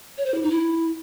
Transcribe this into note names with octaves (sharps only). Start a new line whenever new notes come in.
C#5
C5
E4
D#4
E4